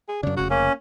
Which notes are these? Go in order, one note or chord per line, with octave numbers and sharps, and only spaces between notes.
G#4
F#2 C#3 D4
F1 C#3 F#4
A#3 C#4